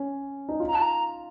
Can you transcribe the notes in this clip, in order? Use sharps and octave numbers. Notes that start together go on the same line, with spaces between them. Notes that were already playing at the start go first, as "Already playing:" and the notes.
Already playing: C#4
D#4
F4
A#5
A5
A#5